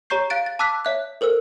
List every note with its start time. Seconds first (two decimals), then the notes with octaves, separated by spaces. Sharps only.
0.10 G4 C#5 A#5 C#6 G6 C7
0.30 F5 F#6 A6 D7
0.46 A6
0.59 A5 D6 E6 F#6 B6
0.85 C#5 E5 F#6
1.21 A4 A#4 C5 E6